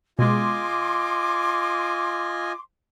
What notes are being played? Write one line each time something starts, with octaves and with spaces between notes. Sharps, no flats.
B2 G#3 F4 D#5 G#5 C6 D6